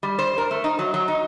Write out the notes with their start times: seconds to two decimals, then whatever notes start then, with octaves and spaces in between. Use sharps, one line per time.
0.03 G3
0.19 C5
0.38 A#4
0.51 A3
0.64 D#4
0.79 F#3
0.94 F#3
1.08 D#4